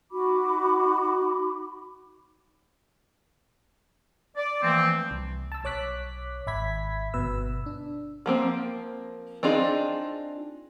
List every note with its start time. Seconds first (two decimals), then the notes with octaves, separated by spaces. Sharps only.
0.11 D#4 F#4 B5 D6
4.36 D5
4.62 E3 F3 A3 A#3 C4
5.11 C2
5.52 A5 E6
5.64 B1 C#5 D6 F#6 B6
6.47 G#1 E5 B5 G#6 B6
7.14 G1 B2 B4 E6
7.66 D4
8.26 F3 A#3 C4
9.43 C4 D4 D#4 F4 G#4